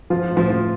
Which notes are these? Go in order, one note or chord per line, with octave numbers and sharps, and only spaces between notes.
F3 F4
A2
F3 F4
F3